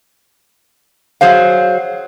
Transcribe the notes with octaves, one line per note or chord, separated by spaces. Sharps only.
F#3 G#4 C5 F5